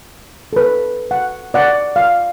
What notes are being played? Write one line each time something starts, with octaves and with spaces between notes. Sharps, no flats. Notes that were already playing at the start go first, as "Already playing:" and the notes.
A4 B4
F#5
D5 F#5 D6
F5